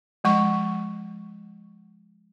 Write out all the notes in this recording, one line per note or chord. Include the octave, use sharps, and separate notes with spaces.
F3 G#3 C#6